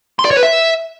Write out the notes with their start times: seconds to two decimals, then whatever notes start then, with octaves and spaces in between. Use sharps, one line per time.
0.19 C6
0.25 D5
0.31 C#5
0.37 B4
0.43 E5